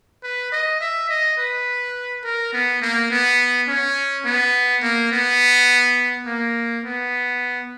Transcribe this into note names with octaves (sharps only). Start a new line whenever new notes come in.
B4
D#5
E5
D#5
B4
A#4
B3
A#3
B3
C#4
B3
A#3
B3
A#3
B3